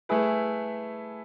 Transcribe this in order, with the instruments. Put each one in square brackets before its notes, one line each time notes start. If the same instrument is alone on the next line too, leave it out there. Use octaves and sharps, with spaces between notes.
[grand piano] A3 E4 G#4 B4